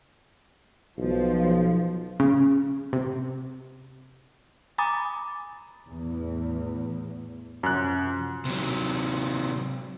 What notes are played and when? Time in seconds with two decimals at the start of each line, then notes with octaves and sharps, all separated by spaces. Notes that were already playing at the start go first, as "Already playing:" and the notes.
0.98 B1 F3
2.20 C#3
2.93 C3
4.78 G#5 A#5 B5 D6 D#6 A6
5.88 E2 A2
7.63 F#2 C3 F3 F#6
8.45 C3 F#3